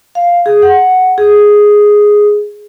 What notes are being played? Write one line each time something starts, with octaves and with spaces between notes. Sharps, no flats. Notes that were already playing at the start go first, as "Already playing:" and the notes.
F5
G#4
F#5
G#4